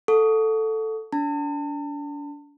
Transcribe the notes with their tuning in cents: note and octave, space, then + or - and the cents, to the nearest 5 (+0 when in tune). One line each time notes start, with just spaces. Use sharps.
A4 +0 F#5 -35 C#6 +35
D4 -35 A5 +40